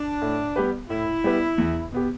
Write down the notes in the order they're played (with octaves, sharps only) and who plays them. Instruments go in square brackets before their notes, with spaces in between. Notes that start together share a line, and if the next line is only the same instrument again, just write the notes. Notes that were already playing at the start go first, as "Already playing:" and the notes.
Already playing: [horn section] D4
[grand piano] A2
G3 B3 G4 B4
[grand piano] A2 [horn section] E4
[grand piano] G3 B3 G4 B4
E2
B2 B3 G4